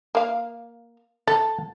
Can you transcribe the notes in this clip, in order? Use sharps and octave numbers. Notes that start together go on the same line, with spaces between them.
A#3 F5
A4 A5